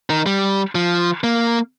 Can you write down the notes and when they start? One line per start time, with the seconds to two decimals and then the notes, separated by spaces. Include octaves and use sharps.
0.10 D#3
0.26 G3
0.75 F3
1.24 A#3